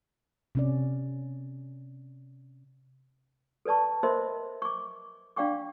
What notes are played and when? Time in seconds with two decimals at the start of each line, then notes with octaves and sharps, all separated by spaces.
0.55 C3 C#4 D5
3.65 A4 B4 D5 A5 C#6
4.03 A#4 C5 D#5 E5 B5 C6
4.62 C#6 D6
5.36 D4 D5 F5 G5 C#6 D6